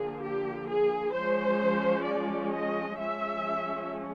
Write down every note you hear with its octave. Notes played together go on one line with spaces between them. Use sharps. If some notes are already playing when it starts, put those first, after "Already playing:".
Already playing: D3 F3 A#3 G#4
G4
G#4
F3 G#3 C#4 C5
D5
D#5
F3 G#3 C#4 E5